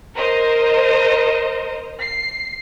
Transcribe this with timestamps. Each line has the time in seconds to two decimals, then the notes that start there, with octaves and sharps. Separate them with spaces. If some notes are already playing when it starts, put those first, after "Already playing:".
0.15 A#4 C5 D#5
2.01 C7